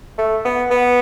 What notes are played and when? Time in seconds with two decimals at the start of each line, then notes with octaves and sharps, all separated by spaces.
0.18 A3
0.45 B3
0.71 B3